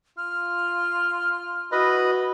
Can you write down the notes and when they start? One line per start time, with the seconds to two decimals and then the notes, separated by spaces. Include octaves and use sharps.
0.17 F4 F6
1.72 E4 F#4 B4 D#5